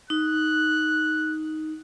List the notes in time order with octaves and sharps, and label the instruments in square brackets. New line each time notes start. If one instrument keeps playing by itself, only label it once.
[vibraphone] D#4 [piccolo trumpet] F#6